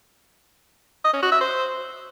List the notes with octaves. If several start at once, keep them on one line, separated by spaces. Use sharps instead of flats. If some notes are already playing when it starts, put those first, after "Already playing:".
D#5
C#4
F#4
E5
C5